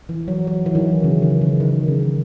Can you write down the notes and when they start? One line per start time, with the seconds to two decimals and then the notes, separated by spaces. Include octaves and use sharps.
0.09 E3
0.28 F#3
0.47 F#3
0.66 E3
0.75 D#3
1.04 C#3
1.22 D#3
1.41 C#3
1.60 D#3
1.88 C#3